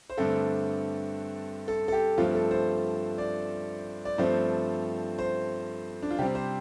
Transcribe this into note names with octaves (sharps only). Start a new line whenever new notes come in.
C5
G2 D3 A3 C4 A4
A4
A4
G4
G2 F3 A3 C4 F4
A4
C5
D5
D5
G2 F3 A3 C4 C5
C5
D4
F4
C3 G3 C4 G4
C5